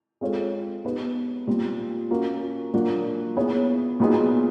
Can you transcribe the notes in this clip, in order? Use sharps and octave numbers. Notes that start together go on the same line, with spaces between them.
G#3 C4 F4 A4 C#5
B3 D#4 G4 B4
A#2 G3 C4
A#3 C#4 F#4 A#4
A#2 F#3 A#3 D4 F#4
B3 E4 G#4 C#5
A#2 F#3 B3 D#4 G#4